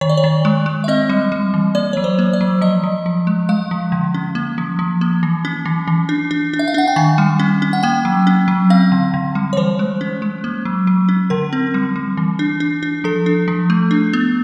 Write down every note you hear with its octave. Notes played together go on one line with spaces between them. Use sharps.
D#3 C#5
D5
C#5
D#3
G#3
G#3
E5
C4 D#5
G3
G3
E3
A#3 D5
F#3 C#5
C5
A#3
D5
F#3
F3 D#5
F3
F3
G#3
G#3 F5
F3
D3
C#4
A#3
F3
F3
A#3
E3
C#4
E3
E3
D4
D4
D4
E5
F5
D4 F#5
G5
D#3 G#5
G3
C#4
C#4
F#5
A#3 G5
F#3
C#4
F#3
C4 F5
D3
D3
G3
C#5
E3 C5
G#3
C#4
G#3
A#3
F#3
F#3
C#4
D3 A#4
C4
G3
G3
E3
D4
D4
D4
F3 A4
D4
F3
A3
D4
B3